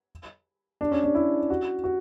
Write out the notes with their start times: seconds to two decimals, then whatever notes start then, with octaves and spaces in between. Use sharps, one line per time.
0.81 D4
0.91 C#4
1.04 D4
1.15 E4
1.50 F#4
1.84 F#4